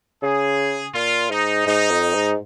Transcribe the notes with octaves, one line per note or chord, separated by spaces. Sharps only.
C#3 G#4
A#2 F4
G#2 D#4
G#2 D#4
F2
G#2